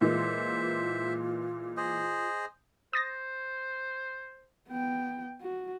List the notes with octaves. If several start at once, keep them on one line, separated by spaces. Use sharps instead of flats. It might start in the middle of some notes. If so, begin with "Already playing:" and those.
A#2 E3 G#3 F4 C5 E5
G#4 C5 D#5
C5 D#6 A6 A#6
B3 G5
F#4